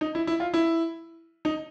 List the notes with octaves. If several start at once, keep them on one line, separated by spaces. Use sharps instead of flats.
D#4
E4
E4
F4
E4
D#4